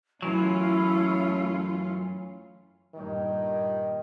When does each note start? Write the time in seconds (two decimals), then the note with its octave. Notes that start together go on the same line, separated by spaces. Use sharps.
0.22 F#2 E3 F#3 A3 C#4 E4 F4
2.95 G2 A#2 D#3